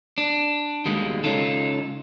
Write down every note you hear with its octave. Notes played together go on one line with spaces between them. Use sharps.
D4
D#2 B2 D#3 G3 G#3 A#3
C#2 F#2 C#4 D#4 F4 A4